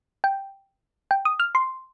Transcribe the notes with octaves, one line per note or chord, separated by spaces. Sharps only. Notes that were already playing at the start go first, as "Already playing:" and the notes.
G5
G5
D#6
F6
C6